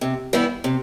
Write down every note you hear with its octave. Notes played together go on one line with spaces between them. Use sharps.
C3
E3 G3 B3 E4
C3